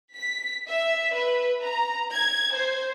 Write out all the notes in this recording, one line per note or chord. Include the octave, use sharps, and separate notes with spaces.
B6
E5
B4
A#5
G#6
C5